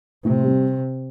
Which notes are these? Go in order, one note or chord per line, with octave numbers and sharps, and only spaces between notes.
A2 C3
G3 C4